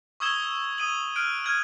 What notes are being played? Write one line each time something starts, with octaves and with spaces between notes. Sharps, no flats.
C#6 D#6 E6 G#6 E7 G7
D#6 D#7 F#7
F6 F#6 D7
F6 G#6 D#7 F#7